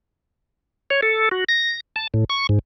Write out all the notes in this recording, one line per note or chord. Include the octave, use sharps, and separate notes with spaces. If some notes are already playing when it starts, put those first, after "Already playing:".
C#5
A4
F#4
A#6
A5
A2
C#6
G#2